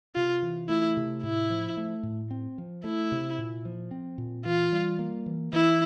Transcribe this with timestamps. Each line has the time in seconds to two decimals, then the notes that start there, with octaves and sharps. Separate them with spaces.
0.16 C3 F4
0.42 E3
0.69 A3 E4
0.97 C3
1.23 A2 E4
1.50 F3
1.77 A3
2.03 A2
2.31 C4
2.58 F3
2.84 A3 E4
3.12 C3
3.39 A#2
3.65 F3
3.91 C4
4.18 A#2
4.45 E3 F4
4.72 G3
4.99 A#3
5.26 E3
5.53 E3 E4